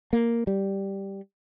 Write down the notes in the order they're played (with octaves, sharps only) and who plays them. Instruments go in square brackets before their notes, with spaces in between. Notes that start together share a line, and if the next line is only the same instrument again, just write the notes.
[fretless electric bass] A#3
G3